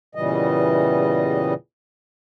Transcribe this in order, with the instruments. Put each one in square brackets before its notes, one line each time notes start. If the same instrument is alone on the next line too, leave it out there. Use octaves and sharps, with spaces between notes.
[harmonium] E2 A#2 C#3 E3 G3 D#5